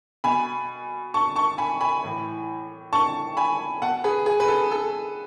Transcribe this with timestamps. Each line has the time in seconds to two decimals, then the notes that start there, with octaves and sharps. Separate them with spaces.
0.24 B2 G#5 B5
1.14 A5 C#6
1.36 A5 C#6
1.58 G#5 B5
1.81 G#5 B5
2.04 A2 E3
2.93 A5 C#6
3.37 G#5 B5
3.81 B2 F#5 A5
4.04 G#4 B4
4.26 G#4
4.40 B4
4.48 A4
4.71 A4